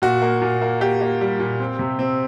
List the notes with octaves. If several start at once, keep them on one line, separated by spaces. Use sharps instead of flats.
A#2 F#4
A#3
A#2
A#3
A#3 G4
A#3
G3
A#2
C4
C3
C4